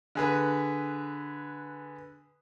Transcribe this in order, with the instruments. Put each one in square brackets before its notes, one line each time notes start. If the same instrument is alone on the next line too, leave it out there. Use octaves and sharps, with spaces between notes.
[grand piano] D3 G#4 B4